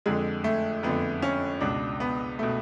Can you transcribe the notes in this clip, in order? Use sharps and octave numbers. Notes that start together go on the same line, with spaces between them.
F2 D3 G#3
A3
F2 D3 B3
C#4
C#2 B2 D4
B3
B2 A3